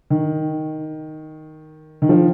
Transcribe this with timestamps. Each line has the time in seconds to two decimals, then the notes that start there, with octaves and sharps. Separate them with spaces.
0.10 D#3
2.02 D#3
2.09 F3